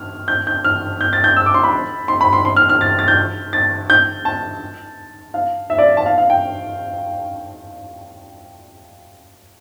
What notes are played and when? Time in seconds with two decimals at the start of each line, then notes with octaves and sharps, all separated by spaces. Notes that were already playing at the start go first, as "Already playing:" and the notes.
Already playing: F6
0.28 G6
0.47 G6
0.65 F6
1.01 G6
1.13 A6
1.24 G6
1.37 E6
1.46 D6
1.54 C6
1.64 B5
2.08 C6
2.21 B5
2.33 C6
2.45 C6
2.56 F6
2.69 F6
2.81 A6
2.99 A6
3.08 G6
3.53 A6
3.90 G6
4.25 A5
5.34 F5
5.70 E5
5.78 D5
5.97 A5
6.06 F5
6.18 F5
6.30 G5